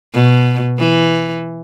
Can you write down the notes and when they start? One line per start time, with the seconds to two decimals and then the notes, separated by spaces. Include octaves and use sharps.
0.14 B2
0.79 E3